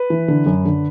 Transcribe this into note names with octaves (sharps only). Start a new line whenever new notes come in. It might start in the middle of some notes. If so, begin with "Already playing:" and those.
Already playing: B4
E3
D3
F#2
D3